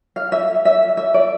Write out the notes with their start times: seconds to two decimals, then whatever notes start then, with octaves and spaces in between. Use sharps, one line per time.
0.16 F5
0.32 E5
0.65 E5
0.97 E5
1.14 D5